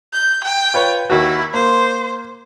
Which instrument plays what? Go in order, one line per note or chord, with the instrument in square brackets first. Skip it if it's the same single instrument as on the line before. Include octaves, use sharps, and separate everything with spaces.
[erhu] G6
G5
[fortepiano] F4 B4 C#5
[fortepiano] D#2 F#4 [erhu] E4
[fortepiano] A#3 [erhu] C5